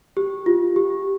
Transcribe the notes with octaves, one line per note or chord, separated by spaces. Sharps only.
G4
F4
G4